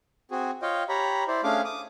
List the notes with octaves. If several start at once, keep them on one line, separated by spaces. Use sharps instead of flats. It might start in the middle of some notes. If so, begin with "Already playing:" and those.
C4 F#4 G#4
F4 C#5 D#5 F5 G5
G4 C#5 A#5 B5
E4 C5 D5
A3 C#4 D4 G#4 F5 D6
D6 D#6